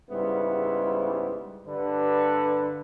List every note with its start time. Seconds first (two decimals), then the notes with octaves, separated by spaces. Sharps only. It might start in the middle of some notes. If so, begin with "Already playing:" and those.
0.10 G#2 C#3 G3 B3 E4 C5
1.66 G2 D3 B4